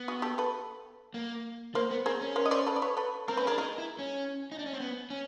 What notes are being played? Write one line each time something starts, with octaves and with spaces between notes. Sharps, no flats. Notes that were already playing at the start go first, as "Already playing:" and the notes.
Already playing: B3
F#4 G#4
G4 A4
A4 B4
A#3
A#3 A#4 C5
B3
C4 G#4 A#4
C#4
A#4 C5
D#5
C5 D5
A4 B4
D5
B4 C#5
A4 B4
C4 A#4
C#4 B4
D4 G#4 A#4
D#4 G#4 A#4
E4
C#4
D#4
D4
C#4
C4
B3
C#4